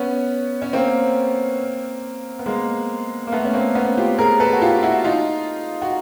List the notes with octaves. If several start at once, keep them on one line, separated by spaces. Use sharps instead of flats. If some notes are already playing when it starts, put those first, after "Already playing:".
Already playing: B3 C#4
C#4
A#3 C4
B3
G#3 A#3
A#3
A3 B3
C#4
A#3 C4
B3 C#4
F4 G4
G#4 A#4
A4 B4
F#4
F4 G4
E4 F#4
D#4 F4
F#4